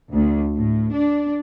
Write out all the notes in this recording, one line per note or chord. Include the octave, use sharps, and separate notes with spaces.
D2
A2
D4